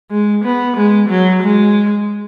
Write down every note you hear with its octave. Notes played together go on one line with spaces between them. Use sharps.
G#3
B3
G#3
F#3
G#3